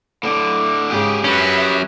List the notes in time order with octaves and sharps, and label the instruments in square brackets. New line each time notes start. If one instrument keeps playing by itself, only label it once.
[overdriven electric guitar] A2 D3
[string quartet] G#2 C#3 [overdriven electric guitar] G4 G#4
[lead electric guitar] F#3 C#4 [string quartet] B4 E5